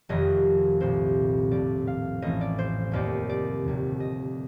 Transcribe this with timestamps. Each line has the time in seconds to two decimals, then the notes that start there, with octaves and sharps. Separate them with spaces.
0.09 F1 F2 C3 D#3 D#5
0.80 C2 A#2 C5
1.51 A#1 A2 D5
1.87 F5
2.22 A1 A2 D#5
2.41 D5
2.59 C5
2.92 F1 D#2 D#3 D5
3.29 D5
3.64 F1 D#2 D3
4.00 D#5